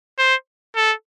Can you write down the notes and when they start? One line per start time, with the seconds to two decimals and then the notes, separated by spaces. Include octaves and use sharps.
0.18 C5
0.76 A4